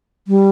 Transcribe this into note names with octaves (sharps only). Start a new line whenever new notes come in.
G3